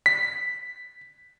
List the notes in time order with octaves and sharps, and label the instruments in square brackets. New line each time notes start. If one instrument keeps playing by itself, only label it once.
[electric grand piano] B6